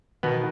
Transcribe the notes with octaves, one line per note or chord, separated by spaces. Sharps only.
B2 D#3 B3